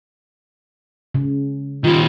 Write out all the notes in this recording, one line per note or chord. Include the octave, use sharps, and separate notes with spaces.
C#3
D#3 G3 F4